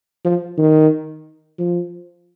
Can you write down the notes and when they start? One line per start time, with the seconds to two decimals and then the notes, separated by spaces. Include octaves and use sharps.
0.25 F3
0.58 D#3
1.59 F3